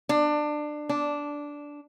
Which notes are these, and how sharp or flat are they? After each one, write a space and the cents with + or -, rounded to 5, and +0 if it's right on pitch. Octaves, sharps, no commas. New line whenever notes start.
D4 +20
D4 -10